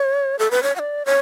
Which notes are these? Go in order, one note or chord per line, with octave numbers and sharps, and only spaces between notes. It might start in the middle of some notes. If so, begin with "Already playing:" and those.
Already playing: C#5
A4
B4
C#5
F#5
D5
C#5